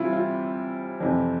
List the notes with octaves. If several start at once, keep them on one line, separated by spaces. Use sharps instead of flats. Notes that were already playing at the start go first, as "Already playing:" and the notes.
Already playing: C3 E3 G3 C4 E4 F4
F4
F2 C3 E3